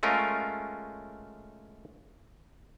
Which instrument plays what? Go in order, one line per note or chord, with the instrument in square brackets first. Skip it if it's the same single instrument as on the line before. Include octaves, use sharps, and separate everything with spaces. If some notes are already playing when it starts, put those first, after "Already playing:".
[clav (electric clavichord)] G#3 A3 C#4 F4 A#4